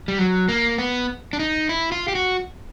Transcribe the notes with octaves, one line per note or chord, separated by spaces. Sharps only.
G3
F#3
A#3
B3
D4
D#4
E4
F4
G4
F#4